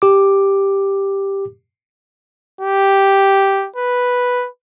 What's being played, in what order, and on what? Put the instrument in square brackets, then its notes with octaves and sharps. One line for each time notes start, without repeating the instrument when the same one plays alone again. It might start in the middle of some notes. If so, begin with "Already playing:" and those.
[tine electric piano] G4 D6
[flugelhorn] G4
B4